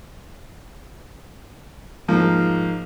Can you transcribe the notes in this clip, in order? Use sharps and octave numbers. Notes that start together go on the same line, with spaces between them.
G#2 F3 A#3